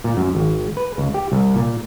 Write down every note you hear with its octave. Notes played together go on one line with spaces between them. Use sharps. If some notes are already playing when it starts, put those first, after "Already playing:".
A#2
F#2
G#1
B4
C#2
G4
C2
A#2